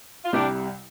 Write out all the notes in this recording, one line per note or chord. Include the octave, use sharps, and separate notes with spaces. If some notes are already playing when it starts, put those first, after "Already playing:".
F4
C2 C3 G3 D4 G4